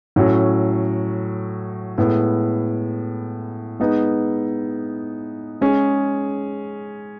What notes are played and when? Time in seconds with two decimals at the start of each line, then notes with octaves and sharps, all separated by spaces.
0.16 A2 F#3 C#4 F#4
1.98 A2 G#3 B3
3.79 G#3 B3 D#4
5.61 G#3 C#4 G#4